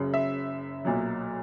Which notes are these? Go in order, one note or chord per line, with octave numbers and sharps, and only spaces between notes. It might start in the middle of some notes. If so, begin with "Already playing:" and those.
Already playing: F#1 F#2 C#3
E5
B1 A#2 F#3